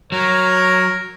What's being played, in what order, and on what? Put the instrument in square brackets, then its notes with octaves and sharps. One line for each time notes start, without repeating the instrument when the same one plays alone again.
[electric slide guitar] F#3 [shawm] A#4 [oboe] C#5